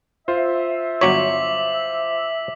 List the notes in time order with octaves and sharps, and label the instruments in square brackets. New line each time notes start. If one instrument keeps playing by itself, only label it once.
[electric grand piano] F4 C5 [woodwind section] E5
[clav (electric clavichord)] G1 F#3 C#5 [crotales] D6 B6 F#7